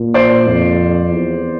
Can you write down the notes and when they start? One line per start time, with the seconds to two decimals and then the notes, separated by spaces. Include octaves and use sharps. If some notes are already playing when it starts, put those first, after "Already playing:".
Already playing: A#2
0.14 C5 D5
0.47 F2
1.12 E2